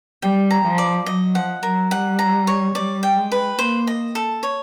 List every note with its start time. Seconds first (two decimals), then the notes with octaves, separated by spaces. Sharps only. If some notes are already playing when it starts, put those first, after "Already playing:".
0.22 G3 G5
0.51 A#5
0.64 F3
0.78 D5
1.06 F#3 D#5
1.34 F3 F#5
1.63 F#3 A#4
1.91 G3 F#5
2.19 A#5
2.47 C#5
2.75 G3 D5
3.03 G5
3.17 G#3
3.32 B4
3.59 A#3 C5
3.87 D#5
4.15 A4
4.43 C#5